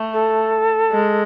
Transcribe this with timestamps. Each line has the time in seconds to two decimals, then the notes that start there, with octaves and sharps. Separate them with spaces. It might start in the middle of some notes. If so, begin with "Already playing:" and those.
Already playing: A3
0.14 A4
0.92 G#3